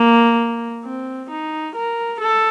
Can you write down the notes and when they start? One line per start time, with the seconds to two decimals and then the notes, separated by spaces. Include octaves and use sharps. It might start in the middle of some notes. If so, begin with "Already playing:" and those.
Already playing: A#3
0.84 C4
1.29 D#4
1.75 A#4
2.20 A4